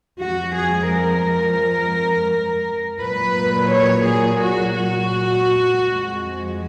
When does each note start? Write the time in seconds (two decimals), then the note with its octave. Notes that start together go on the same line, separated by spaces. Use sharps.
0.20 F2 F3 G#3 F#4
0.56 G#4
0.91 A#4
3.00 A#2 F#3 B4
3.71 C#5
4.07 G#4
4.41 F#4
4.76 F#4
5.81 F2 F3 G#3